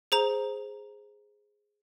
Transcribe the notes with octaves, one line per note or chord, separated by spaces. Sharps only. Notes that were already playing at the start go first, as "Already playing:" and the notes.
G#4 C5 A#5 F7